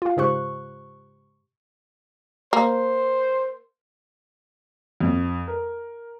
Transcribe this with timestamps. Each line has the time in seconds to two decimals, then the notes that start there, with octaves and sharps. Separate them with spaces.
0.02 F4 F5
0.17 G#2 C#3 G4 C5 C#6 F#6
2.53 A#3 C5
5.00 F2
5.47 A#4